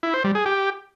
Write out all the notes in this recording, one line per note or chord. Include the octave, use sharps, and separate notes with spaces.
E4
C5
G3
G#4
G4